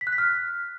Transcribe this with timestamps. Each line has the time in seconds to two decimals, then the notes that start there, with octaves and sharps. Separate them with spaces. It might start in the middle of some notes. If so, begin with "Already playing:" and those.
0.01 B6
0.07 F#6
0.13 B6
0.18 F6